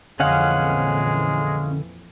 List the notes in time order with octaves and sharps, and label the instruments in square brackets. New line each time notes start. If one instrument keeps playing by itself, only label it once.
[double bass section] F2 A#2 E3 [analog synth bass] D3 [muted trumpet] G#3 [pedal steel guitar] C#4 F5 F#5